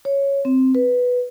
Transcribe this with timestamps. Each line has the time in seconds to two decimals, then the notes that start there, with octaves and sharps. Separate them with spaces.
0.05 C#5
0.45 C4
0.75 B4